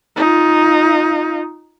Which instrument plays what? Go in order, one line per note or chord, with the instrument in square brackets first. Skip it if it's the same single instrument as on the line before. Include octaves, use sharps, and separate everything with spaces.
[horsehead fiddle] D#4 F4